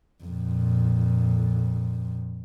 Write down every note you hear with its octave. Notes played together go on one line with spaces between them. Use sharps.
F2 A#2